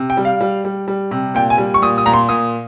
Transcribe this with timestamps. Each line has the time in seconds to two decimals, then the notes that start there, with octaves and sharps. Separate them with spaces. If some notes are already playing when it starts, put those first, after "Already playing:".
Already playing: C3
0.10 G5
0.17 G3
0.25 F5
0.41 G3
0.65 G3
0.88 G3
1.11 C3
1.35 A#2 G5
1.50 G#5
1.58 G3
1.74 C#6
1.82 A#2 D#6
1.98 D#6
2.06 A#2 A#5
2.14 C6
2.29 A#2 D#6